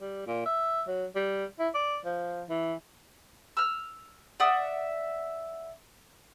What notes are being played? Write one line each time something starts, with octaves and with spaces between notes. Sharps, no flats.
G3
A#2
E5
F#3
G3
E4
D5
F3
E3
E6 F6
D5 E5 F#5 D#6